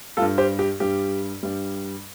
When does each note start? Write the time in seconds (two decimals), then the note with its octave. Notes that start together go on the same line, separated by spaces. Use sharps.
0.17 G2 G3 F4 A4
0.38 G4 C5
0.59 G4
0.80 G2 G3 G4
1.43 G2 G3